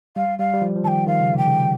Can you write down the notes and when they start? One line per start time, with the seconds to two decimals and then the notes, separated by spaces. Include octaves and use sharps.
0.16 G3 F5
0.39 G3 F5
0.53 G3
0.62 F3
0.76 F3
0.84 D#3 A5
0.87 G5
1.07 D#3 F5
1.20 C#3
1.34 C3 G5
1.47 C#3